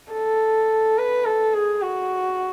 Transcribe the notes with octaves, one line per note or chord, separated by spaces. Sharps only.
A4
B4
A4
G#4
F#4